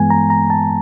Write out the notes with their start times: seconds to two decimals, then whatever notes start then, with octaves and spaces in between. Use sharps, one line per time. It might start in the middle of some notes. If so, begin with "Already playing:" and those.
Already playing: G2 E3 G#3 B3 G#5
0.10 A#5
0.30 A#5
0.50 A5